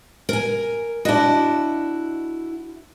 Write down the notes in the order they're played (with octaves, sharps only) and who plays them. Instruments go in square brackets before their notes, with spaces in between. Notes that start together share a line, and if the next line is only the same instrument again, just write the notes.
[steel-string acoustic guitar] A#4 G#5
[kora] D4 D#5 [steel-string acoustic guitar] E4 F#4